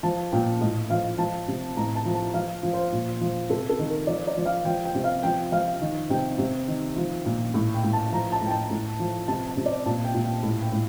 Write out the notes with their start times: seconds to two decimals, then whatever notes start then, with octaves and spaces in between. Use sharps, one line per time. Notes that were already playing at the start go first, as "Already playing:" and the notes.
0.03 F3 A5
0.32 A#2 G5
0.61 A2 D#5
0.90 F3 F5
1.18 F3 A5
1.48 C3
1.76 A2 A#5
1.96 A5
2.05 F3
2.15 A5
2.34 F3 F5
2.63 F3
2.73 C5
2.92 A#2
3.21 F3
3.49 C3 A4
3.69 A4
3.79 D#3
3.89 A#4
4.07 F3 D5
4.27 D5
4.37 F3
4.46 F5
4.65 F3 G5
4.85 G5
4.95 C3
5.04 F5
5.23 F3 G5
5.52 F3 F5
5.81 D#3
6.10 C3 G5
6.38 C3
6.68 D#3
6.96 F3
7.25 A#2
7.54 A2
7.74 G5
7.84 A2
7.93 A5
8.12 F3 A#5
8.32 A5
8.41 A2
8.46 G5
8.51 A5
8.70 A2
8.99 F3
9.28 C3 A5
9.47 A5
9.57 C3
9.66 D5
9.86 A#2 A5
10.04 G5
10.14 A#2
10.24 G5
10.43 A2
10.62 G5
10.72 A2